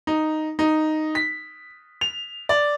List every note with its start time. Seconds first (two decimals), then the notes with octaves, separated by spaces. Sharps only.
0.07 D#4
0.59 D#4
1.15 B6
2.01 F7
2.49 D5